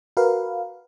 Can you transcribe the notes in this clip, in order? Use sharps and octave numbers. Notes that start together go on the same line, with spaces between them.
F#4 A#4 B4 F5